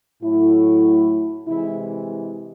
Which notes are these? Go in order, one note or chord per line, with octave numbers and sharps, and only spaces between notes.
A2 F#3 A3 E4
C3 E3 G#3 E4